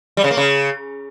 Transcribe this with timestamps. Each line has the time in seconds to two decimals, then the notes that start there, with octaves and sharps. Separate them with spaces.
0.17 G3
0.24 C#3
0.31 A#3
0.37 C#3